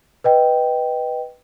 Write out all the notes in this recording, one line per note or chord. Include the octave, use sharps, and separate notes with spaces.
B4 D#5 G5